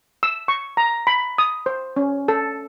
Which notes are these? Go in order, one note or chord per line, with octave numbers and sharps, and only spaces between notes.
E6
C#6
A#5
B5
D#6
C5
C#4
A4